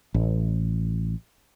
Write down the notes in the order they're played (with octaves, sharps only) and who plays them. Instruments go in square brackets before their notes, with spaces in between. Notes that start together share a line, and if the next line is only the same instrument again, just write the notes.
[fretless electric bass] A1